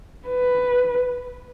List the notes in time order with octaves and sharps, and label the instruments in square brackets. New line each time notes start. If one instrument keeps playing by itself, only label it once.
[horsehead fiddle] B4